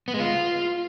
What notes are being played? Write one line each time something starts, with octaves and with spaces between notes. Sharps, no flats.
B3
G#3
F4